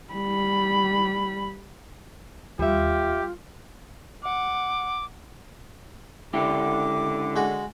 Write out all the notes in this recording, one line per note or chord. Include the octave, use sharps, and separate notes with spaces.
G3 B5
D#2 G3 F4 G4 E5
F#5 D6
C#2 D3 E4 G4 D6
G#3 F#4